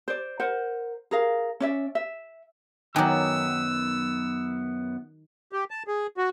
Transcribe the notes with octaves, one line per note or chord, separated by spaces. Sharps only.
C5 D5
A#4 C5 F#5
G#4 A#4 F5
C#4 D5 E5
E5
F#2 D#3 F#3 B3 G5 G#5 D6 E6
G4
A5
G#4
F#4